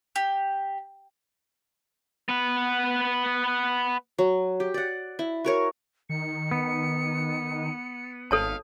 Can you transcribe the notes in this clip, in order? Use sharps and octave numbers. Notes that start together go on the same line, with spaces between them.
G4
B3 B4
F#3
G4
D5 F#5
E4
F#4 A#4 C#5
D#3 C#7
B3
G#1 A4 C#5 F5 A5